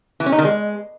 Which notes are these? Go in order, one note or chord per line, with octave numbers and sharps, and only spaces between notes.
E3
C#4
D#4
D#3
G#3